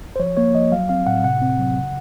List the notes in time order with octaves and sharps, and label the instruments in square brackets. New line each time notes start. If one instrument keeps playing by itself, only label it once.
[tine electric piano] C5
F3 C#5
A#3 C#5
F3 D#5
F#3 F5
C4 F5
A2 F#5
C3 F#5
C4
F#3
C#3